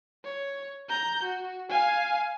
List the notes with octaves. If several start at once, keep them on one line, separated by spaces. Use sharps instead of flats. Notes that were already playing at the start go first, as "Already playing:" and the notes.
C#5
A#5 G6
F#4
F5 G#5